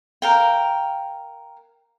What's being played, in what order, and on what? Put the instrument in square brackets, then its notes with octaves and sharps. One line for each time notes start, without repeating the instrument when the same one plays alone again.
[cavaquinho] A#4 F5 G5